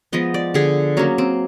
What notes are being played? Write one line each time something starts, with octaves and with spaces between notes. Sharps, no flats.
F3 G#3 B3 D#5
D5
D3 G#4
F#3 A#3 C#4
C4